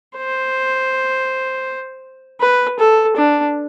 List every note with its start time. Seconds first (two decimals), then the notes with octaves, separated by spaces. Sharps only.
0.17 C5
2.41 B4
2.79 A4
3.17 D4